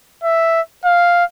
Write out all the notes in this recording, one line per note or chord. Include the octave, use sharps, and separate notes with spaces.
E5
F5